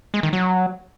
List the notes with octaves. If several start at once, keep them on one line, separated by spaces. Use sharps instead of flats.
G#3
D#3
F#3